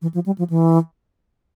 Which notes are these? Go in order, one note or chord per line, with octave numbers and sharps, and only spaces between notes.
E3
F3
G3
F3
E3